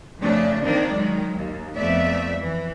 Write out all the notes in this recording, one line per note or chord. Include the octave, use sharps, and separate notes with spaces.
F2 C#3 A3 D4
D#3 A#3 C4 D4
D#3 F#3 G#3
D#2
F2 A3 B3 D5 E5
E3